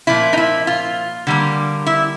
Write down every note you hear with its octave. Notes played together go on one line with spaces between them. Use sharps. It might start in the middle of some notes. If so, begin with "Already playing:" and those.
A#2 F3 A#3 E4
D#4
E4
F4
D3 G3 A#3
E4